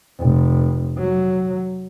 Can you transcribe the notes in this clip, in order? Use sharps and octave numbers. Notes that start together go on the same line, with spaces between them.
F1
F#3